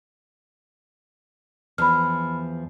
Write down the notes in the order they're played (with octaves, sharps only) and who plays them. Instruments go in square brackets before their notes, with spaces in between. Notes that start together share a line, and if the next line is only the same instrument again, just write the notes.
[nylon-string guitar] E2 F3 [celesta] B5 F6